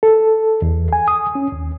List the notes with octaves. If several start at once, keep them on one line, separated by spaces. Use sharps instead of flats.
A4
E2
G#5
D#6
C#4
D#2